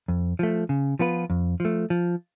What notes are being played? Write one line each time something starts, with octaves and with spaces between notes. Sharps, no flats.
F2
F3 A3
C#3
F3 B3 F4 B4
F2
F3 A3
F3